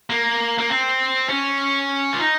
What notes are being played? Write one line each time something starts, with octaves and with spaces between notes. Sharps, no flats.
A#3
A#3
C4
C#4
F4
D#4